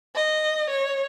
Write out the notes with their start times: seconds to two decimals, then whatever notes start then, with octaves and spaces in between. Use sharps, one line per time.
0.15 D#5
0.70 C#5